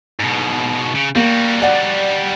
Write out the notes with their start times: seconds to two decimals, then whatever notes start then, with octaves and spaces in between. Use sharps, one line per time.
0.20 G#2 B2
0.95 C#3
1.15 G3 A#3 F#4
1.62 D5 F#5